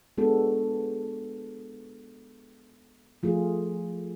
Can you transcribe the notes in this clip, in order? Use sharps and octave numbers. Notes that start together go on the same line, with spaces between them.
G#3 B3 D4 F#4 A4
F3 A3 F4 G#4